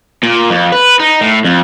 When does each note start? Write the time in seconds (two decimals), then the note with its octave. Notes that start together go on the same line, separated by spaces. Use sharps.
0.23 A#2
0.50 F2
0.72 B4
1.00 D#4
1.21 A2
1.45 F2